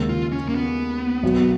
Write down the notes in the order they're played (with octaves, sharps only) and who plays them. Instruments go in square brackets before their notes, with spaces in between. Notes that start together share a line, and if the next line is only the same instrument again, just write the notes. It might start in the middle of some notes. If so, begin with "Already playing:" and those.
Already playing: [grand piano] D#2 C#3 G#3
[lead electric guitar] F4
C#4
A#3
B3
[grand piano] B1 B2 F#3